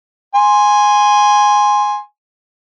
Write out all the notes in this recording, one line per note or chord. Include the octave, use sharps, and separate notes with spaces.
G#5 C6